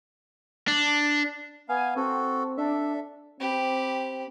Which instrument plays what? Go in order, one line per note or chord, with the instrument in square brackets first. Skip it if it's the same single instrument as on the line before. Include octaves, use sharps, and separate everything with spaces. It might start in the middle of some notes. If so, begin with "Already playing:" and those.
[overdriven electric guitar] D4
[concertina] B3 F5 [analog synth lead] G#5
[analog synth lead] C4 [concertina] F#4 A4
[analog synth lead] D4 [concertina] A4 E5
[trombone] C4 [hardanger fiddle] G4 B5